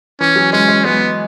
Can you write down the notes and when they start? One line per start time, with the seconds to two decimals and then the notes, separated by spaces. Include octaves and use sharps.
0.20 E3 C#4
0.36 F#3
0.53 G#3 C#4
0.68 G#3
0.84 G#3 B3